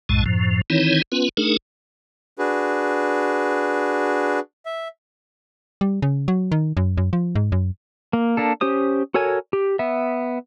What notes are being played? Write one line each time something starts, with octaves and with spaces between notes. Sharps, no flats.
B1 F#2 A2 G#3 A5
F#2 A2 F3
D#3 E3 C4 D#4 E4 C#5
B3 C#4 F4 B4
A3 D4 D#4 G#4 A#4
D4 F#4 G#4 B4
E5
G3
C#3
F#3
D#3
F#2
F#2
F3
G#2
F#2
A#3
A#3 D4 A4
C#4 G4 C5 D#6
F#4 A4 A#4 C#5 G#5
G4
B3 E5